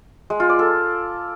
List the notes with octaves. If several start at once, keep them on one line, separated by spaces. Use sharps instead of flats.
G#3
F4
D5
A4